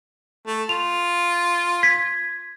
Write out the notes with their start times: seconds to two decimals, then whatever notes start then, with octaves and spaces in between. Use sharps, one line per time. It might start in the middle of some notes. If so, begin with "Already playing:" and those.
0.47 A3
0.69 F4 F7
1.83 G#6 B6